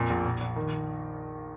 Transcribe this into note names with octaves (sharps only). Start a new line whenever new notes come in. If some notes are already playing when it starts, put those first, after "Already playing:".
Already playing: F2 A#2
A#1
A#1
A#1
D#3